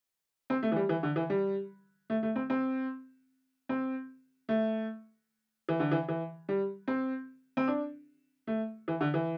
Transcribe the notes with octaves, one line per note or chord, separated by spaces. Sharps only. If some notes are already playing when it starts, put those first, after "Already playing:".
C4
A3
E3
G3
E3
D3
E3
G3
A3
A3
C4
C4
C4
A3
E3
D3
E3
E3
G3
C4
C4
D4
A3
E3
D3
E3